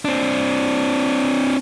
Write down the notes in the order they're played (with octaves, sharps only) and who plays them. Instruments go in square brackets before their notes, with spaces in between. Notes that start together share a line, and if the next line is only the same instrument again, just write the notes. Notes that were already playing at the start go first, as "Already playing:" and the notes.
[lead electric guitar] C4 D4